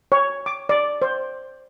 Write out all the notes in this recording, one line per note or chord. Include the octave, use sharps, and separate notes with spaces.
C#5
D6
D5
C5